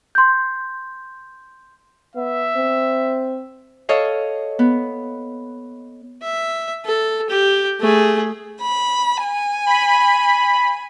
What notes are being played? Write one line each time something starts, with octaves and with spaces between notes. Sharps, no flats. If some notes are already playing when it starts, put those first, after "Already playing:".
C6 G6
B3 E5
C4
A4 C#5 D#5 F5
B3
E5
A4
G4
A3 G#4
B5
G#5
B5